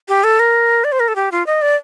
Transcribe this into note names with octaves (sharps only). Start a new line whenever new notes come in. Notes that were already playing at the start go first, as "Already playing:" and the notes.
G4
A4
A#4
D5
C5
A#4
A4
G4
F4
D#5
D5